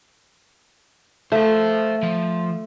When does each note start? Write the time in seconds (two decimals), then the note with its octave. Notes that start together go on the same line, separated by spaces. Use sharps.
1.32 A3 C5 F5
2.03 F3